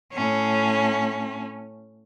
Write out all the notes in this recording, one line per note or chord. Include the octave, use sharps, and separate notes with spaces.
A2 C#4